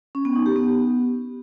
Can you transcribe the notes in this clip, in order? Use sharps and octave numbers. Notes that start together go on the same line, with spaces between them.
C#4
B3
D#4
G4
B3